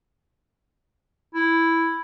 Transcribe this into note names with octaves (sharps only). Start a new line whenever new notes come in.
E4